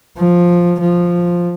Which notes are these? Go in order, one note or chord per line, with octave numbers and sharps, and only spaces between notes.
F3
F3